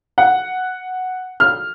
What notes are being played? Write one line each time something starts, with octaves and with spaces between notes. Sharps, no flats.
F#5
F6